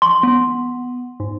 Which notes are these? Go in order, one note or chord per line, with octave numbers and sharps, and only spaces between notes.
C6
B3
G#2